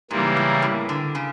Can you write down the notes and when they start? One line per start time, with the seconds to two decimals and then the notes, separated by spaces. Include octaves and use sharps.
0.11 G#2 C#3 E3 G3 A#3
0.37 A2
0.62 A2
0.89 D3
1.15 C#3